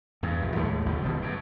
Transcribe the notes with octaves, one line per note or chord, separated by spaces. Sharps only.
E2 G2
A#1
D#2 A2 G#3 A3
F1 D2 B2 F3
F#1 B2 D#3 G3
F#2 B2